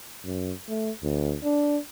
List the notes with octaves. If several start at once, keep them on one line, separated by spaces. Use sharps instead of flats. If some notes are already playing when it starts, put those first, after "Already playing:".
F#2
A3
D2
D4